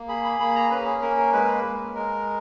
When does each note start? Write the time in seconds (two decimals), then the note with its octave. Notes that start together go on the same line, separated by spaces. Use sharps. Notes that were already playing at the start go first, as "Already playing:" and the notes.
Already playing: A#3
0.08 G#4 B5
0.24 B5
0.39 A#3 B5
0.56 A#5
0.70 C#4 B4
0.86 G#4
1.02 A#3 A#4
1.17 A#4
1.33 G#3 B4
1.64 G#3
1.95 G#3 A#4